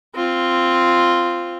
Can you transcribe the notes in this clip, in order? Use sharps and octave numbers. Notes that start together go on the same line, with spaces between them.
C4 F4